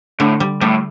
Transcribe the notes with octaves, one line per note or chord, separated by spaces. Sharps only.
A2 D3
G3
A2 G3